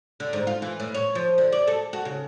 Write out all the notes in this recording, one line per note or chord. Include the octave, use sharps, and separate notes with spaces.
D3
G#2
F4
E3
A2
C#5
F3
D3
D5
A4
F#4
C#3